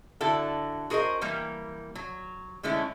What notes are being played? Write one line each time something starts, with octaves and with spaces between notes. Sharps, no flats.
D3 E4 F#4 A4
F#4 G#4 A#4 C5 D#5
E3 G3 A#3
F#3
D3 G#3 A3 C#4 E4